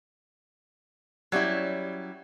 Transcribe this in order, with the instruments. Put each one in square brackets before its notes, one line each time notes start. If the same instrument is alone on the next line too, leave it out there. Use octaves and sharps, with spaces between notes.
[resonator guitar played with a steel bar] F#3 G3 C#4 E4